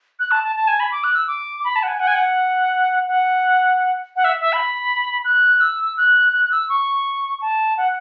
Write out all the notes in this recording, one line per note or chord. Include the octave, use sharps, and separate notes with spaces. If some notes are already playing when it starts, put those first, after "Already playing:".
F#6
A5
A5
A5
G#5
B5
D6
F#6
E6
D6
B5
A5
F#5
G#5
F#5
G#5
F#5
F#5
F#5
E5
E5
B5
F#6
E6
F#6
F#6
F#6
E6
C#6
A5
F#5